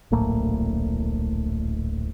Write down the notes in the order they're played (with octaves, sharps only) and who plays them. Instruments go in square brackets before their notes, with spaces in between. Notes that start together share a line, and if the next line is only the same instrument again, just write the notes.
[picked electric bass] D1 A#1 A2 A#3